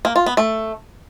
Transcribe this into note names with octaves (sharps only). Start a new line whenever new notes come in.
A#3
F4
B3
A3